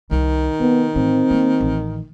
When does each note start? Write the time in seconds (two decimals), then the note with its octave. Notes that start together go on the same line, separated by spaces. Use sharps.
0.11 C2 D#3
0.60 C3 B3
0.96 A2 E3 C4
1.31 A#3
1.61 A1